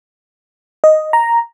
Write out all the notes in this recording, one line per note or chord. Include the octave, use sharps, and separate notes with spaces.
D#5
A#5